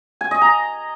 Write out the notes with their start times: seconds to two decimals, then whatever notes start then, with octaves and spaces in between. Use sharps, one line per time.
0.21 G#5
0.31 D#5
0.41 A#5